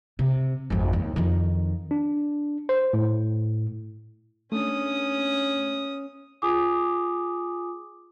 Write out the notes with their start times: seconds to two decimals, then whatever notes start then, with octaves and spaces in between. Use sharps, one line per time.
0.19 C3
0.70 G#1 F2
0.93 D#2
1.16 F2 D#3
1.91 D4
2.69 C5
2.93 A2
4.52 A3 C#4 D4 D#6
6.42 F4 G#4 G#5 D6 D#6